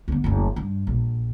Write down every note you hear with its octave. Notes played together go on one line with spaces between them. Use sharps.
D2 B3
F#1 D2
G2
A#1